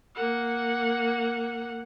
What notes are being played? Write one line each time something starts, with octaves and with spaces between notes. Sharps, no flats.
A#3 F#5